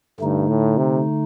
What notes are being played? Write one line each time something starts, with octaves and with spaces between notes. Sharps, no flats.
G2 D3 A3 D#4
A2
C3